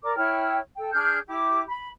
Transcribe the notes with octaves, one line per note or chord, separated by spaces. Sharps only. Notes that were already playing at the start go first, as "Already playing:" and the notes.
A#4 D5 D6
E4 C#5 G5 F6
A4 G5
D4 G#4 F6 G6
E4 G4 D6
B5